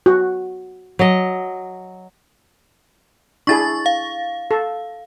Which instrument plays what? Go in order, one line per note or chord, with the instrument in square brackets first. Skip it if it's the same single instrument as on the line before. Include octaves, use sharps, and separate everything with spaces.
[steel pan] F#4
[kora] F#3 D#5
[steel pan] D4 E4 G#4 [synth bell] C#6 A6
[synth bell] F5
[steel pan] A4